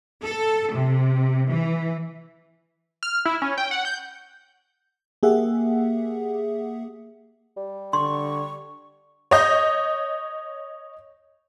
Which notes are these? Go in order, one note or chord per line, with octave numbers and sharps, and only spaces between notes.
A4
C3
E3
F6
E4
C#4
G5
F#5
G6
A#3 G4 G#4 E5 F#5
G3
D3 C6 C#6
C#5 D#5 G6